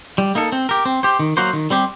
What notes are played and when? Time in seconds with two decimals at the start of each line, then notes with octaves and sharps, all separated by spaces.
0.18 G3
0.35 A#3 D#4 A4
0.52 C4
0.69 G4 A#4
0.85 C4
1.03 G4 C5
1.19 D#3
1.37 F#3 A#3 F#4 C5
1.53 D#3
1.70 G3 C4 G4